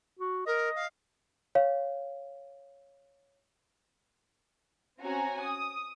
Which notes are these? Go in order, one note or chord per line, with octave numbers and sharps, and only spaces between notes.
F#4
A#4 D#5
F5
C#5 F5
C4 C#4 F#4 G#5 A#5
D#6